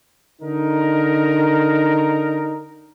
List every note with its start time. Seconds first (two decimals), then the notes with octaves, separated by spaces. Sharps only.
0.42 D3 D#4 A#4